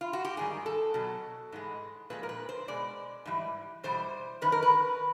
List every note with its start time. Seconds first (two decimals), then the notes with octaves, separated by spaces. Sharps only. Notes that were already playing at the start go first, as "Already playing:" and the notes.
0.01 F4
0.13 F#4
0.25 G4
0.37 G#2 D#3 G3 G#4
0.66 A4
0.94 B2 F#3
1.52 G#2 E3 G#3
2.10 A#2 F3 G#3 B4
2.23 A#4
2.29 B4
2.49 C5
2.68 B2 G#3 D5
3.26 G#2 E3 G3
3.84 E2 B2 G3 C5
4.41 F#2 D#3 B4
4.52 A#4
4.63 B4